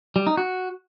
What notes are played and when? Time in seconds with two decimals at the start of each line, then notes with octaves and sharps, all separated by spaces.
0.16 G3
0.27 D#4
0.37 F#4